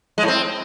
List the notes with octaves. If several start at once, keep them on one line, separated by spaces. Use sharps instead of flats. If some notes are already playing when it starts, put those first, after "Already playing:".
G#3
A2
C4